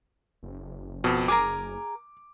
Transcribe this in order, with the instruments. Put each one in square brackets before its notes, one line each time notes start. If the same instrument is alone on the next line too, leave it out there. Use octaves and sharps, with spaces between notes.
[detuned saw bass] F#1
[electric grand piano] F2 B2
[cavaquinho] G#4 A#4 A#5 [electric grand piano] D6